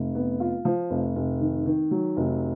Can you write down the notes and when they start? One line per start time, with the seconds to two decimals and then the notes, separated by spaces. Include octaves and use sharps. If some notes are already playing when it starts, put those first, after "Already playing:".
Already playing: F1
0.15 B3
0.40 F4
0.65 F3
0.90 F1
1.16 F1
1.40 D#3
1.66 D#3
1.91 F#3
2.17 F1